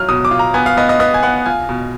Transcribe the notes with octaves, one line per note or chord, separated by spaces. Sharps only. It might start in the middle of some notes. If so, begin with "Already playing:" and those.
Already playing: F#3 F4 F6
B2 D#6
D6
F4
A#5
B3 G#5
F5
B3 D#5
D#5
B3 D#5
G#5
B3 F#5
F4 G#5
B2